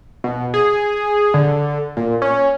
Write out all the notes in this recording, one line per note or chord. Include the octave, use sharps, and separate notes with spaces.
B2
G#4
D3
A#2
C#4